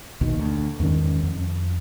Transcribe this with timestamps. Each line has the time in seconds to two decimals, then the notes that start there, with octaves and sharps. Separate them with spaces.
0.21 A#1 D#2 B2 D#3
0.39 D2
0.80 E2 G#2 D#3 C#4
1.23 F2